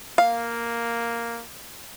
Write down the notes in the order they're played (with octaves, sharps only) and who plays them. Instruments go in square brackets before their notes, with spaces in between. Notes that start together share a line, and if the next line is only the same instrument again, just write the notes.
[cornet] A#3 [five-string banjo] F5